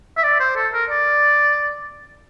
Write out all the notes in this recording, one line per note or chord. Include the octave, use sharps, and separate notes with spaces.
E5
D5
C5
A4
A#4
D5